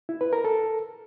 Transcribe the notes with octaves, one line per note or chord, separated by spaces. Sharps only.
E4
B4
A#4
A4